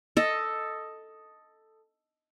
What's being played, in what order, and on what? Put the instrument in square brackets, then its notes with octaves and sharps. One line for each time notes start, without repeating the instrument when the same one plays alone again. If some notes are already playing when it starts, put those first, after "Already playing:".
[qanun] A4 D#5